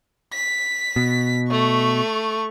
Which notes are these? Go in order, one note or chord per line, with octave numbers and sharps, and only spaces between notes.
B6
B2
A3 C#6